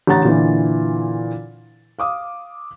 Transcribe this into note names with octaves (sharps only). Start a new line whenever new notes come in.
A1 D3 F#5 A#5 A6
A#2 D3 E3
F5 D6 D#6